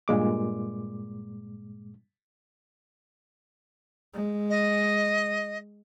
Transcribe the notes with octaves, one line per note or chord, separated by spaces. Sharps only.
G2 A#2 G#3 D6
G#3
D#5